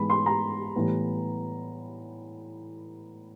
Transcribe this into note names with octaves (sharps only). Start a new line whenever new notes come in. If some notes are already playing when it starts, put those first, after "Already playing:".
Already playing: G#2 E3 G#3 B3 B5
C6
A#5
A2 E3 G3 B3